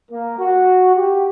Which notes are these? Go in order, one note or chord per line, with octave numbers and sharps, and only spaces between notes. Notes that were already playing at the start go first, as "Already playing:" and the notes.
A#3
F#4
G4